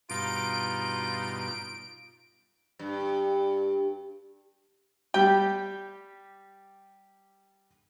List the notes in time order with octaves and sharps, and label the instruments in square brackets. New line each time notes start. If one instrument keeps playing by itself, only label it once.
[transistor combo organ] G2 B2 [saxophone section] D#4 F4 [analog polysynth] D7
[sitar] G2
[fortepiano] G3 G4 [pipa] G5